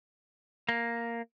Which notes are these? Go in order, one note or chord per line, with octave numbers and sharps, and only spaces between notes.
A#3